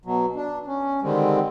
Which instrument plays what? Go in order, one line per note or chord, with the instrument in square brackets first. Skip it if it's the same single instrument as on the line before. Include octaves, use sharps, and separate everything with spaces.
[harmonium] B2 F#3
D4
C#4
D3 D#3 G3 G#3 C4